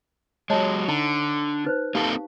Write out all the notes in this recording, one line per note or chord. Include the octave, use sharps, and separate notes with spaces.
F#3 G#3 C#5 D#5 A5
D3 D#4 A#5
D#4 B4 C5
A#3 C4 D#4 G4 A4 F5